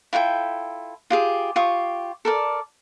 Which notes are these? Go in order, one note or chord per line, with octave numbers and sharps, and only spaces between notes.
E4 F4 A4 G5
F4 G4 G#4
F4 G4 C#6 D#6
A4 A#4 D5